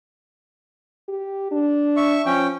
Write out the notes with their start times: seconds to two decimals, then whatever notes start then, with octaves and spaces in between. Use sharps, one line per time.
1.08 G4
1.52 D4
1.97 E5 C#6
2.26 F3 C#4 G5